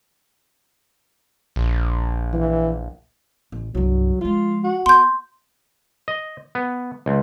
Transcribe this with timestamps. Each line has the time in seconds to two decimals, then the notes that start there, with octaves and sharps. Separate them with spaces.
1.56 A#1
2.33 E3
3.52 A1
3.75 C2 G2 F#3
4.21 F3 G#3 F4
4.64 F#4
4.86 B3 C6 G6
6.08 D#5
6.55 B3
7.06 C#2